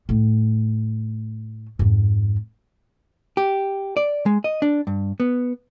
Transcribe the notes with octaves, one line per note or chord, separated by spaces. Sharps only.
A2 A3
F2 G#2
G4
D5
G#3
D#5
D4
G2
B3